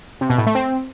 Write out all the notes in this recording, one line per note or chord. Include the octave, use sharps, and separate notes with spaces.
C3
B2
A2
A3
C4